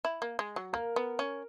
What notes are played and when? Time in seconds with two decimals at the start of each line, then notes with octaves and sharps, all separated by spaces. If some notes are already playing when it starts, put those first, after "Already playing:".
0.05 E4
0.22 A#3
0.39 G#3
0.56 F#3
0.73 A#3 A#4
0.96 B3
1.19 C#4